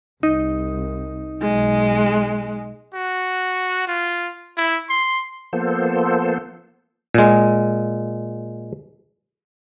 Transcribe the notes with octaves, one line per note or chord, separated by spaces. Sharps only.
C2 D#4
B1 G#3
F#4
F4
E4
C6
F3 A#3 B3 A4 C5
A#2 G#3